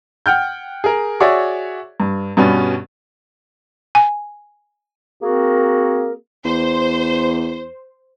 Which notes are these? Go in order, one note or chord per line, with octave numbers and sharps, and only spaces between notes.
F#5 G5 F6 G6
G#4 A#4
F#4 G#4 C#5 D5 E5
G2
G2 B2 G3 B3 C#4
G#5
A#3 C4 F#4 G#4 A#4
E2 C5